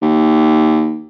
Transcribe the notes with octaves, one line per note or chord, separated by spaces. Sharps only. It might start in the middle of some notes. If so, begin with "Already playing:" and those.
D#2